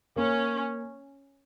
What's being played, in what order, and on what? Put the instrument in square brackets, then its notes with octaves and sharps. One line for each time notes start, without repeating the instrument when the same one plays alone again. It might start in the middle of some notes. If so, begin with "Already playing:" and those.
[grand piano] A#3 [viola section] C#4